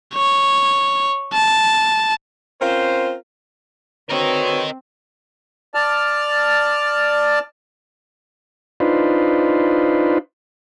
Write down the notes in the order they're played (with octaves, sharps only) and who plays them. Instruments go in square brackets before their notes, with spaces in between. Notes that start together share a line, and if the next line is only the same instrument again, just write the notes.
[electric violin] C#5
A5
[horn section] C4 C#4 F4 A#4 C5
[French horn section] D3 F#4 B4 [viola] C4 [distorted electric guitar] A#4 D#5 [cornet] C#5
[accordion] D5 A5 F6
[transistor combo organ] D4 D#4 F4 B4 C5